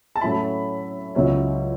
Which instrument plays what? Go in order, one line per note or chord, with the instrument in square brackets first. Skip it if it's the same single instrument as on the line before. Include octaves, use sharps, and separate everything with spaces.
[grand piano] A5
A2 F#3 A3 C#4 E4 B5
C#2 C#3 F#3 C#4 E4